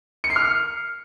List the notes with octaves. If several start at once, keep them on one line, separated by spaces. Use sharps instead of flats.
C#7
C7
F6